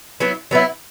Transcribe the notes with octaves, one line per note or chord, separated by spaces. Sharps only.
F#3 B3 E4
F#3 B3 E4